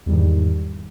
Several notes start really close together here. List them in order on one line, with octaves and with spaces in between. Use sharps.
E2 G3 D#3 G#2